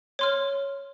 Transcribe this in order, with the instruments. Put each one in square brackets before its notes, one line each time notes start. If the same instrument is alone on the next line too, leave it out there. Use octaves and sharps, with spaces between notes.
[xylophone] C#5 C6 F6